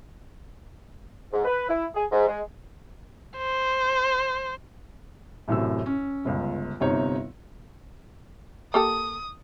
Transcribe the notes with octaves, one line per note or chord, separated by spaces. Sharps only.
G#2
B4
E4
G#4
G#2
G#3
C5
A1 F#2 A2 C3 E6
C#4
G1 C#2
G1 C3 D#4 C#5
A#3 G4 A4 D#6